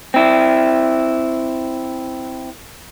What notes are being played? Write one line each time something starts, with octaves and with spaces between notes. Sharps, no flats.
C4 E4